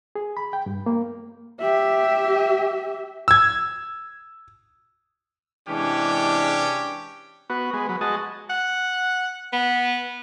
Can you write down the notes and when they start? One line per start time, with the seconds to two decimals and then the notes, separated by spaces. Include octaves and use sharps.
0.16 G#4
0.37 B5
0.53 G5
0.66 G2
0.86 A#3
1.60 G4 E5
3.28 E6 G#6
5.68 C3 E3 G#3 C#4 D4 G4
7.50 B3 F#4
7.73 G#3 B3
7.89 F#3 B4
8.01 G#3 F#4 D#5 A5
8.49 F#5
9.52 B3